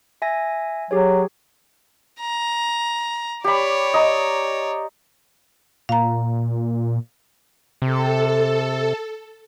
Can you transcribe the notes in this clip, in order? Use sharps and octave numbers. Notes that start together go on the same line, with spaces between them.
E5 G#5 A#6
F#3 G4 G#4 C#5
A#5
G4 C#5 D5 B5
D#5 A#5
A#2 F5 A#5
C3 A4